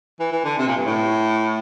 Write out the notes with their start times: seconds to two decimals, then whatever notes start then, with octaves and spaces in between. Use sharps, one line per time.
0.20 E3
0.32 E3
0.45 D3
0.58 C3
0.67 A#2
0.77 G2
0.86 A2